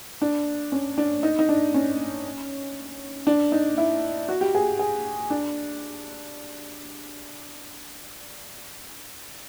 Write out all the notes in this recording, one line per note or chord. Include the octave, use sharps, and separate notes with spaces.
D4
C#4
D4
D#4
D#4
D4
C#4
D4
D#4
E4
F#4
G4
G#4
G#4
D4